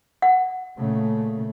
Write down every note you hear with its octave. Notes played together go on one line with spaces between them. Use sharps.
F#5
A#2 C#3 A3